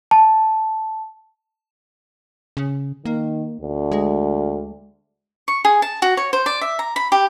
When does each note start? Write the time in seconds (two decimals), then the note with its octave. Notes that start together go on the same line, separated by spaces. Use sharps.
0.11 A5
2.57 C#3
3.05 D#3 A#3
3.61 D2
3.92 G#3
5.48 C#6
5.65 G#4
5.82 A5
6.02 F#4
6.17 C#5
6.33 C5
6.46 D5
6.61 E5
6.79 A#5
6.96 B5
7.12 G4